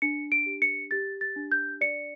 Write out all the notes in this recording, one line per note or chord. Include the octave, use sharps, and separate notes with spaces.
D4 C#7
D7
G4
C#7
G4 A6
A6
D4
G6
D5 C#7